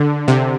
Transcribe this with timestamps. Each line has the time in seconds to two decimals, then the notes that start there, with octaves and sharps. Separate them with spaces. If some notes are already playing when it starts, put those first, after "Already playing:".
Already playing: D3
0.28 C3